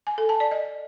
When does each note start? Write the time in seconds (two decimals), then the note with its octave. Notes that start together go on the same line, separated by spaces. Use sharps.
0.07 G#5
0.18 A4
0.29 A5
0.40 D5
0.51 D#5